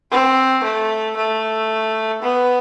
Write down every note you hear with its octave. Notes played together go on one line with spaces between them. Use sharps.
C4
A3
A3
B3